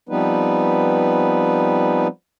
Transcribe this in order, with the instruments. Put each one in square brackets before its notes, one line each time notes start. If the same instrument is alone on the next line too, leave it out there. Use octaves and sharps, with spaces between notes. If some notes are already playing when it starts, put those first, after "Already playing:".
[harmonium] F3 G3 B3 C4 D#4 B4